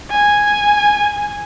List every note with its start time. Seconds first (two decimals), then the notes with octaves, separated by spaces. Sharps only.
0.10 G#5